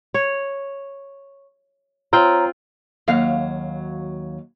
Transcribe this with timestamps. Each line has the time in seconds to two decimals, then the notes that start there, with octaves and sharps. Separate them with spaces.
0.14 C#5
2.13 C4 F4 C#5 G5 A#5
3.08 D#2 F#3 F5